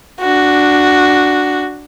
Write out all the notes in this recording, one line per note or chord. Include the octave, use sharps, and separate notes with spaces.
D4 F#4